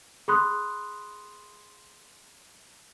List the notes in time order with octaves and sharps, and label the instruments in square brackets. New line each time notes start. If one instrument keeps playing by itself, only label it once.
[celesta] G#4 B5 C6 D#6 F#6